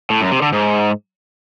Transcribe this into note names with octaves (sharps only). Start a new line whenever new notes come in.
A2
F#2
C3
D3
G#2